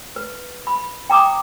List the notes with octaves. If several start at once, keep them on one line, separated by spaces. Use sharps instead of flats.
B4
B5
G5 A#5 D6 D#6